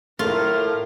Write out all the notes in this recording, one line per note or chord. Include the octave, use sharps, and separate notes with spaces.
A2 A3 A#3 F4 A#4